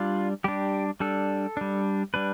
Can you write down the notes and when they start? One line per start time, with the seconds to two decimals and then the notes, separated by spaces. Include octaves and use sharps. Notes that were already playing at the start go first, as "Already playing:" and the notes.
Already playing: G3 D4 F4
0.44 G3 D4 G4
1.00 G3 D4 A4
1.57 G3 D4
2.14 G3 D4 B4